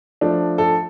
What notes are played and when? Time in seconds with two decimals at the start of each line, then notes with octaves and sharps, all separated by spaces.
0.21 F3 A3 D4
0.58 A4